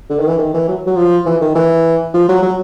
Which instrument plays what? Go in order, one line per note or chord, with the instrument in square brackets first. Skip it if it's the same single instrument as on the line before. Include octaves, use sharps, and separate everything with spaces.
[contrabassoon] D3
D#3
E3
D#3
E3
F#3
F#3
F3
E3
D#3
E3
F3
F#3
F#3